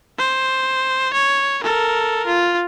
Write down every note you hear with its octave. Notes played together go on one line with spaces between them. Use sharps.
C5
C#5
A4 A#4
F4